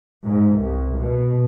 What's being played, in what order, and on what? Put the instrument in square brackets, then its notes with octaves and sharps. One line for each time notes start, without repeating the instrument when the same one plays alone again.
[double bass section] G#2
C2
B2